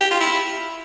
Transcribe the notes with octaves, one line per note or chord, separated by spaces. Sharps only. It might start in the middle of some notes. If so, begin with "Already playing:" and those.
G4
F4
E4